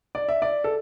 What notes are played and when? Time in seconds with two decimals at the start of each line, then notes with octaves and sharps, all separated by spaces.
0.15 D5
0.29 E5
0.42 D5
0.64 A4